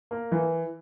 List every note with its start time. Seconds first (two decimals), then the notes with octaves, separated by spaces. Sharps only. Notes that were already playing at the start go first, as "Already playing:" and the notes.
0.11 A#3
0.32 E3